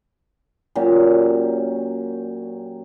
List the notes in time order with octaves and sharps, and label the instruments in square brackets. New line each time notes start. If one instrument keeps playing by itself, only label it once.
[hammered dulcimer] A#2 F#3 C#4 G4